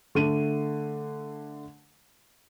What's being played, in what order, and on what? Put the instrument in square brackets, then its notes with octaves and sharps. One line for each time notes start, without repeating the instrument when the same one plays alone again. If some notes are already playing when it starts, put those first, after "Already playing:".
[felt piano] D3 A3 D#7